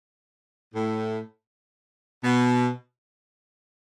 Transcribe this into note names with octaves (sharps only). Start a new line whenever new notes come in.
A2
B2